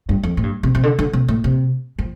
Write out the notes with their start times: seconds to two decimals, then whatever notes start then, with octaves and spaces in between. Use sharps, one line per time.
0.09 G2
0.23 F2
0.37 A2
0.43 G2
0.63 C3
0.75 C3
0.83 D3
0.99 D3
1.13 C3
1.28 A2
1.44 C3
1.99 F3